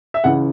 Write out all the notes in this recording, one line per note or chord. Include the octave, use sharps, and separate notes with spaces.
E5
C#2 C#3 E3 F#5